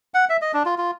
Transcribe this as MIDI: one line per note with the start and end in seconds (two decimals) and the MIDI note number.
0.14 0.25 78
0.29 0.37 76
0.42 0.52 75
0.54 0.63 62
0.66 0.75 65
0.78 0.91 65